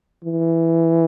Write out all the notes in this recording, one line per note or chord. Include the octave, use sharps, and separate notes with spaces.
E3